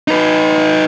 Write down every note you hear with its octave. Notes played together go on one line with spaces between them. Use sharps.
D#4 B4